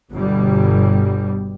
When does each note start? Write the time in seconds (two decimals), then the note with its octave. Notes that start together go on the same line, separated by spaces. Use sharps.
0.11 G1 B2 G3